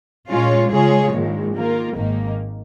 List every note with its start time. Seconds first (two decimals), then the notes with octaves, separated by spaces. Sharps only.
0.29 A#2 G#3 C#4 F4 C#5
0.71 C#3 G#3 F4 G#4 C#5
1.13 A#1 G#2 D#3 G#3
1.54 D#3 A#3 F4 A#4
1.96 G#1 G#2 D#3 A#3 D#4